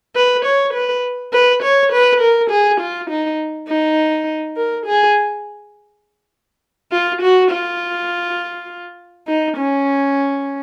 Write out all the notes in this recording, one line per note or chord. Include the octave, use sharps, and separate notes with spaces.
B4
C#5
B4
B4
C#5
B4
A#4
G#4
F4
D#4
D#4
A#4
G#4
F4
F#4
F4
D#4
C#4